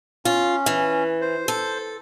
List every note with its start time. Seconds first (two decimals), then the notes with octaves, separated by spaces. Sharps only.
0.25 C#4 F4
0.66 E3
1.21 C5
1.48 A4